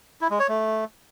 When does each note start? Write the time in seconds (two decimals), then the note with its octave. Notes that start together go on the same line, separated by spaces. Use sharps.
0.21 E4
0.30 G#3
0.40 C#5
0.49 A3